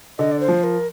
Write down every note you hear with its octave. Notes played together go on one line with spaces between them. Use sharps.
D3 D#5
D5
C5
F3
A#4